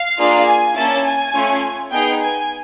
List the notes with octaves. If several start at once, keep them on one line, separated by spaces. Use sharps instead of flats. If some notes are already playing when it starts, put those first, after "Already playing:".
Already playing: F5
A#3 D4 F4 G#4
G#5
A#3 C#4 E4 A5
G#5
A3 C#4 F4
B3 D#4 G#4 G5
G#5